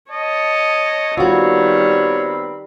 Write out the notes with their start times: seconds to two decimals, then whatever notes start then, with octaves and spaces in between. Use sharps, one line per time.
0.12 C#5 D#5 A5
1.17 D#3 G3 B3 C4 F4 F#4 C#5 B5